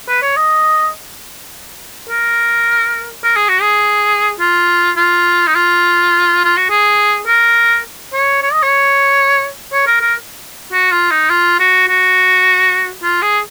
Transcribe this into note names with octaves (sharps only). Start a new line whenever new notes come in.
B4
C#5
D#5
A#4
A#4
G#4
F#4
G#4
F4
F4
D#4
F4
F4
F#4
G#4
A#4
C#5
C#5
D#5
C#5
C#5
A#4
A#4
F#4
F4
D#4
F4
F#4
F#4
F4
G#4